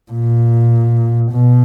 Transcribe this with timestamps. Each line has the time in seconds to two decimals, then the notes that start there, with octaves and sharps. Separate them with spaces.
0.12 A#2
1.32 B2